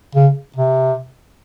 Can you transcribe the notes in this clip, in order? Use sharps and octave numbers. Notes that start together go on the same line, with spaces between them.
C#3
C3